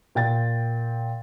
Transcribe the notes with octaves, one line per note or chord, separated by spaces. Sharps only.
A#2 G5 A6